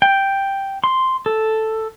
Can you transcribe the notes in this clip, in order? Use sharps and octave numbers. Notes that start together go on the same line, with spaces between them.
G5
C6
A4